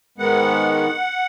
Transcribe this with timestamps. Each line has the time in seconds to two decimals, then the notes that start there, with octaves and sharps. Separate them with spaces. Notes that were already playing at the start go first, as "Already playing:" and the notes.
0.18 G#2 D#3 G#3 B3 F#5